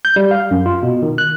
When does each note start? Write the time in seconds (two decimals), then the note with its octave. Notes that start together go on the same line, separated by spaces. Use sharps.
0.05 G6
0.16 G3
0.31 F5
0.51 F#2
0.66 F4
0.83 B2
1.02 D#3
1.18 F#6